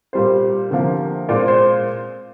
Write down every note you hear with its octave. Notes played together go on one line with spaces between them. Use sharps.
A#2 G3 C4 C5
D2 C3 F3 A#3
A#2 G#3 C4 D5
C5